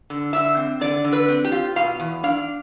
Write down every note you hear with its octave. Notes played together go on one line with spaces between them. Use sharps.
D3
D3 E5
C4
D3 D5
D3
B4
C4
G4
F4
B2 F5
E2
D4 F5